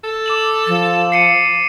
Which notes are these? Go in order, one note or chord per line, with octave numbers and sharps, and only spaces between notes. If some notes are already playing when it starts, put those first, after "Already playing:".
A4
D6 E7 F#7
F3 A6 E7
C7 C#7 D#7